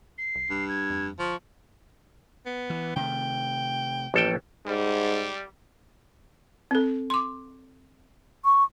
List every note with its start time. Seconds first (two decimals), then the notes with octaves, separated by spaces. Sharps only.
0.18 C7
0.35 C2
0.50 G2
0.68 G#6
0.90 F2
1.19 G1 F3 C#6
2.46 B3
2.70 E3
2.96 C3 D#3 A3 G5
4.14 A1 F3 G#3 A#3 A4 G5
4.66 G#2 G3
6.71 C4 A4
7.10 C6 D6
8.45 C#6